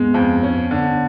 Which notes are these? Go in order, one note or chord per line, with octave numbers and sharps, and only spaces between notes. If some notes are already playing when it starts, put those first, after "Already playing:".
Already playing: G#3 B3
F2
C#4
D3